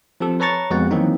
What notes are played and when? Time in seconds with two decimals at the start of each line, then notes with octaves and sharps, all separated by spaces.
0.20 F3 C4 G4 A4
0.40 B4 C#5 A5 A#5 C#6 A6
0.70 F2 G#3 B3 F#4 F#5
0.91 D#3 E3 F#3 A#3 C4 D#4